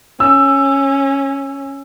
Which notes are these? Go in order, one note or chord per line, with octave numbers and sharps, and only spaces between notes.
C#4 E6